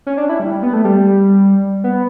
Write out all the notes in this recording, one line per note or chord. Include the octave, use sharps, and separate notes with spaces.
C#4
D4
E4
G3
G3
B3
A3
G3
B3